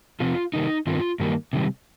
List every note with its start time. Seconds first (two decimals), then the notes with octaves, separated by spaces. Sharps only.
0.20 C3 F3 C4 F4
0.54 C3 D#3 G3 A#3 D#4
0.87 G2 D#3 C4 F4
1.20 G2 D#3 G3 A#3
1.53 C3 D#3 G3